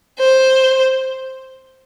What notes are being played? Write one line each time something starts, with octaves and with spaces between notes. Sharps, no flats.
C5